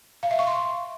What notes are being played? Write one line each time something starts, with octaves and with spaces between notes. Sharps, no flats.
F5
E5
C#6
C6